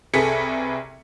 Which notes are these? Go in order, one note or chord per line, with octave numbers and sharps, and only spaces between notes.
C2 G#4 A4 B4 B6 C#7